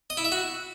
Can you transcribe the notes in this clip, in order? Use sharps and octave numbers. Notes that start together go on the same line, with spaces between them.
D#5
E4
E5
F#4